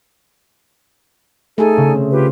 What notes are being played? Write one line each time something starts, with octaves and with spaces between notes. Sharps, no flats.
A3 D#4 G#4 A4 G#5
C#3
C4
F4 G4 B4